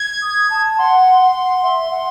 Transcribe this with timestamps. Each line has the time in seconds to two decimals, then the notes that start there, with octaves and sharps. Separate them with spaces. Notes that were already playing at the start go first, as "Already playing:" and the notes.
Already playing: G#6
0.22 D#6
0.50 A5
0.78 F#5 C6
1.21 F#5
1.63 E5
1.91 F#5